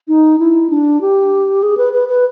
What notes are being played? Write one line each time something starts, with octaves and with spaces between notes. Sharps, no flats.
D#4
E4
D4
G4
G#4
B4
B4
B4